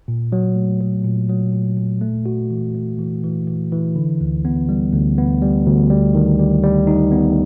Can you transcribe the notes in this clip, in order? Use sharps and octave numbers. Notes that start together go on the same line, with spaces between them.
A#2
F#3
A3
F#3
A#2
F#3
A#2
A#2
A3
F#4
E3
A3
E3
E3
E3
E3
D3
D2
B3
G3
D2
B3
G3
D2
G3
D#3
G3
G3
D#4
B3